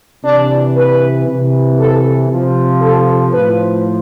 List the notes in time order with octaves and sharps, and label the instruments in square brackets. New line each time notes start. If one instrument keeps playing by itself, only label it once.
[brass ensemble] C3 E3 D4
B4
C3 E3
A4
C3 F3
A4
A2 F3 B4